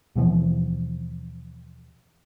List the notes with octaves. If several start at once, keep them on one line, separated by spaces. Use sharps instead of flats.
D#2 B2 E3 F3